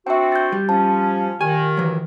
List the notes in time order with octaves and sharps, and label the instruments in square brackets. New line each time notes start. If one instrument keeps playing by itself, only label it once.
[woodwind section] C4 D4 F#4 [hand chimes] E5 G5
[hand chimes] G6 A6
[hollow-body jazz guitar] G3
[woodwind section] F3 C#4 [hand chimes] A5
[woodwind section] A#2 D#3 [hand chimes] G4 [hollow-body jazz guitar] G#5
[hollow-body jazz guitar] E3 F#3